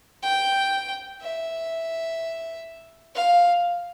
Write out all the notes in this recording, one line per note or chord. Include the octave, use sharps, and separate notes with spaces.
G5
E5
F5